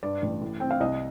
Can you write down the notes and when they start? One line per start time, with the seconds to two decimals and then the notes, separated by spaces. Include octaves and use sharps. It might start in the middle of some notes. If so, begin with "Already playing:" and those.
0.03 G2 D5
0.22 A1
0.41 A2
0.60 C4 G5
0.71 F5
0.80 C2 D#5